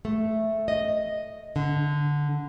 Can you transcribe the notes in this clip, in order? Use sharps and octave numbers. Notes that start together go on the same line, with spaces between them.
A3
D#5
D3